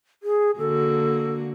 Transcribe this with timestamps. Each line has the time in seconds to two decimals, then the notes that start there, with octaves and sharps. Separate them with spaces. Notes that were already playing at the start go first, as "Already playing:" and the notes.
0.23 G#4
0.59 D3 A#3 F#4 A4